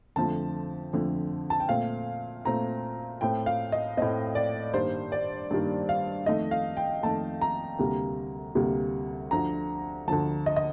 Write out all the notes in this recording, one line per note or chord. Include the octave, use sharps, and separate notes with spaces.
F2 D3 F3 A3 A5
F2 D3 F3 A3
A5
G5
A#2 A3 C4 F5
A#2 A3 C4 A#5
A2 A3 C4 G5
F5
D#5
A2 A3 C4 D#5
D5
G2 D#3 G3 A#3 C5
D5
G2 D#3 G3 A#3
F5
F2 D#3 A3 D#5
F5
G5
F2 D#3 A3 A5
A#5
D2 C3 G3 A#3
D2 C3 G3 A#3
D2 D3 F3 A#5
D2 D3 F3 A5
D#5
D#5